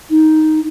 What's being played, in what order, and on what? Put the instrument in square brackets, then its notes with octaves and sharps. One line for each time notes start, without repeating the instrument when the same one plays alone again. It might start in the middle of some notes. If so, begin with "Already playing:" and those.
[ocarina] D#4